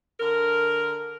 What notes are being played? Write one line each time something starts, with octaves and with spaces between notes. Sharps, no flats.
D3 A#4